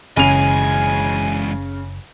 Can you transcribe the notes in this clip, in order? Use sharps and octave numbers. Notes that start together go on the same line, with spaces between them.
F#1 C#3 E3 G#3 G#5 F7